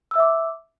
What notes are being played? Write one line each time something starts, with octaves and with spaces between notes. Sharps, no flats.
E5 D6 E6